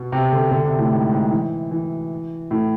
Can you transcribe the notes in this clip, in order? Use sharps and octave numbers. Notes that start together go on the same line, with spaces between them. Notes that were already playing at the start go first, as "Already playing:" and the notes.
Already playing: B2
C3
D3
D3
C3
A2
G#2
G#2
E3
E3
A2